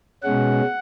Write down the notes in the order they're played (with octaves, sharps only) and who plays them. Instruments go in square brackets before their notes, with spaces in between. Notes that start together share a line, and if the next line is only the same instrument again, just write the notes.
[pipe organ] B2 G#3 C#4 F#5